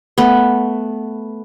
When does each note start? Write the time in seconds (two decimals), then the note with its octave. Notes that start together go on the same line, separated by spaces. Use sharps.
0.18 A3 B3